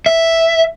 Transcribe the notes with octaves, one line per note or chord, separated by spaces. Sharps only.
E5